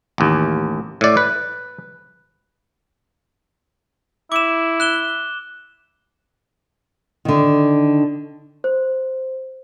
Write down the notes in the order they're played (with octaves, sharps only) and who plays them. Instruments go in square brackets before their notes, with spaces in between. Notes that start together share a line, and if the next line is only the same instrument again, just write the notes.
[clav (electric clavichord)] A1 D#2
A2 D5
B4
[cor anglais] E4 [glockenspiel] D6 E7
[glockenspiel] F#6 E7 G7
[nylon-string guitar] D3 D#3
[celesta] C5